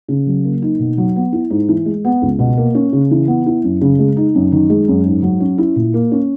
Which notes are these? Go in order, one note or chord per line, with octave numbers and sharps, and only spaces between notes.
C#3
F#3
A#3
D#4
B2
F#3
B3
E4
G#2
E3
G#3
B3
C#2
B2
A#3
C#4
C#3
E3
B3
E4
F#2
C#3
G#3
D#4
F#2
D#3
G#3
F#2
G#2
F#3
C#4
E4
A#2
A#3
C#4